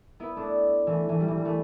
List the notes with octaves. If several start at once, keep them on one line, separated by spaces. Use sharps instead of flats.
B3 E4
A3 D4
E3 A3
E3 A3
G3
E3
G3
E3 A3